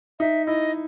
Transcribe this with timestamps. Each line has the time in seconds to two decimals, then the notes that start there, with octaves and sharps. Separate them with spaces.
0.20 D#4 E5
0.46 E4 D#5